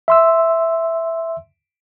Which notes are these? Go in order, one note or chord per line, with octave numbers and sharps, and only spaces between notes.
E5 C6 E6